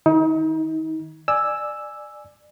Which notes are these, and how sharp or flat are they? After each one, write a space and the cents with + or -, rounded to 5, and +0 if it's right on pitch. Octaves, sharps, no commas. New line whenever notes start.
D#3 +0 D#4 +35
D5 +25 G#5 +0 E6 +0